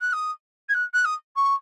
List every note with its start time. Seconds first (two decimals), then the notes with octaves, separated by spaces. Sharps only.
0.01 F#6
0.13 D#6
0.69 G#6
0.74 F#6
0.94 F#6
1.05 D#6
1.36 C#6